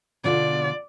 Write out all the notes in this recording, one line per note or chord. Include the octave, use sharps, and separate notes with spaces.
B2 D3 F4 D5